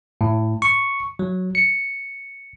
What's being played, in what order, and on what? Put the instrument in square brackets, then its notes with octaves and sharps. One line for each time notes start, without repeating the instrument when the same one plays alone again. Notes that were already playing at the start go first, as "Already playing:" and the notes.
[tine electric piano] A2
C#6
F#3
C#7